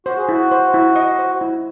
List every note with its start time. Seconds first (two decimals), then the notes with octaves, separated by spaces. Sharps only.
0.06 F#4 C5
0.18 G#4
0.29 E4 F#4
0.51 C5
0.74 E4
0.96 D#5
1.19 C5
1.41 E4